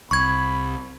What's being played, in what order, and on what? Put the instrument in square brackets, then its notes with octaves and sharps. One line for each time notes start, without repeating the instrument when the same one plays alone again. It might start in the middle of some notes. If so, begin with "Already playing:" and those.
[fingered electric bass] C2 [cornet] B5 [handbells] C#6 G#6